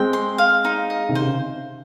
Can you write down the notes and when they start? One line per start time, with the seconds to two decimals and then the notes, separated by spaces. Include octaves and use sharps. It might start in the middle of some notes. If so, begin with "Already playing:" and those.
Already playing: G#3 C4 G5
0.13 C6
0.38 F5
0.65 D#4
0.90 D#5
1.09 C3 D#3
1.15 C5
1.22 C#3